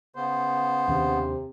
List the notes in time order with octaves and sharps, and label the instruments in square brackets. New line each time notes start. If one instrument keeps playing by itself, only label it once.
[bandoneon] C#3 B3 [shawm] C5
[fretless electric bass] D#2 D#3 D4 [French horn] C3